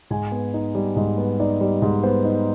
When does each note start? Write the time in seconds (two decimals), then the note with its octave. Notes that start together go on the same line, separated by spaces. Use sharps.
0.10 G#2 G#5
0.32 B3
0.54 D#4
0.75 G3
0.96 G#2
1.18 B3
1.40 D#4 D5
1.61 G3
1.82 G#2
2.03 B3 C5
2.25 D#4